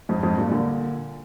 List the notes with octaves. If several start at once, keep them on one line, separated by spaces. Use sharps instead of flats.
F2 G#2
F2 G#2
G2 A#2
A#2 D3